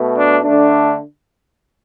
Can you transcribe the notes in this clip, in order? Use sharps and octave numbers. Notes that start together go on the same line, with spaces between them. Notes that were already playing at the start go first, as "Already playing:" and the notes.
Already playing: B2 A3
D4
D3 A3 D4